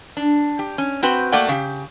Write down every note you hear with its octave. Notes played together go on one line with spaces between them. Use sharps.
D4
G4
C#4
C4 F#4 B4 G5
A3 A#3 F#4 D5 F#5 G5
C#3 G4